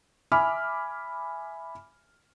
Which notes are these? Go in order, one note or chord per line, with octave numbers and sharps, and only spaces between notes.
E5 G#5 B5 D6 F6